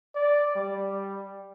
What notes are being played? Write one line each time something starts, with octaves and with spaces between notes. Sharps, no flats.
D5
G3